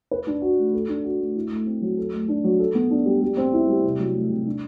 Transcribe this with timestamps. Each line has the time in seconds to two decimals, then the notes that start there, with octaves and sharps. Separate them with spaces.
0.11 B4
0.27 D4
0.42 F#4
0.58 A3
0.74 A4
0.88 D4
1.04 F#4
1.20 A3
1.36 E4
1.51 A3
1.66 C4
1.82 F#3
1.98 A4
2.13 A3
2.28 D4
2.44 F#3
2.59 A4
2.75 B3
2.91 D4
3.06 G3
3.22 G3
3.37 C4
3.53 E4
3.68 G3
3.83 C3
4.00 F#3
4.15 A3
4.31 C3
4.46 D4